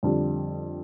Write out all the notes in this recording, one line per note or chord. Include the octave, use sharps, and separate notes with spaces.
F2 D3 G3 D4